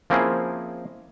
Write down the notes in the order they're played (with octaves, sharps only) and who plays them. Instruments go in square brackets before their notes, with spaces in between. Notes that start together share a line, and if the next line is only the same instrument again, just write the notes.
[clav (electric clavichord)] F3 A#3 C4 C#4 E4 G#4